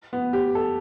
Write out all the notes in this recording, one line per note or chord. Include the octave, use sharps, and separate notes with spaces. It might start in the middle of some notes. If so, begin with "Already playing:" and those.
B3
G4
A4